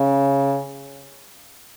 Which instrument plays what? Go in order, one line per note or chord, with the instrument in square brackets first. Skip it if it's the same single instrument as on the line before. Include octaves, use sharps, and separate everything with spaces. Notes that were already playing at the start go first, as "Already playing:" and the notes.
Already playing: [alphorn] C#3